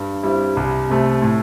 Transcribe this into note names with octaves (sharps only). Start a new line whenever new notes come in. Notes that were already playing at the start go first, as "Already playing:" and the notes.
Already playing: G2
G3 C4 E4
C2
C3 A3
A2